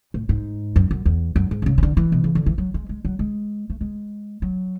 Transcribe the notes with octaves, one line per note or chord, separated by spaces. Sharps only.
A2
G#2
F#2
F#2
E2
F#2
G#2
D3
C#3
C#3
D3
E3
B2
C#3
D3
E3
F#3
G#3
G#3
F#3
G#3
A3
G#3
F#3